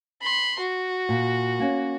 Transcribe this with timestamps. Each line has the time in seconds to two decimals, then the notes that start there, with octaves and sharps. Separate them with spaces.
0.22 B5 C6
0.60 F#4
1.09 A#2
1.60 A#3 C#4